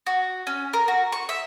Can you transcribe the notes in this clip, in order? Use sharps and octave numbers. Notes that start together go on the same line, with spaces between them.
F#4
C#4
A#4
F#4
C#6
E5